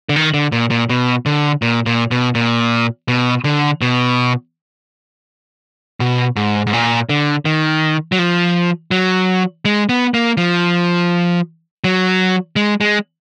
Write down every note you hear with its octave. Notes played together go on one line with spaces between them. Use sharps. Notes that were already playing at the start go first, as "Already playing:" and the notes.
D3
D#3
D3
A#2
A#2
B2
D3
A#2
A#2
B2
A#2
B2
D3
B2
B2
G#2
G#2
A#2
D3
D#3
F#3
F3
F#3
G#3
B3
A#3
F3
F#3
G#3
G#3